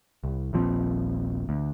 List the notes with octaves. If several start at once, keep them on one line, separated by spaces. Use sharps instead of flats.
C2
D#1 A#1 F3 C4
D2